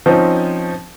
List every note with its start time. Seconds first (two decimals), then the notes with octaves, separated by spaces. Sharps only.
0.06 F3 C4 C#4 D#4